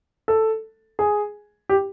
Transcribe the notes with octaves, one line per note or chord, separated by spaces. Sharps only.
A4
G#4
G4